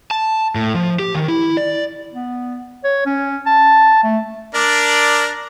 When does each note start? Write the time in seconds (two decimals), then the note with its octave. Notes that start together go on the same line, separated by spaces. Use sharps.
0.11 A5
0.55 A2
0.74 F3
0.99 G4
1.15 D#3
1.28 E4
1.57 D5
2.13 B3
2.84 C#5
3.06 C#4
3.46 A5
4.04 A3
4.55 D4 A#4 D5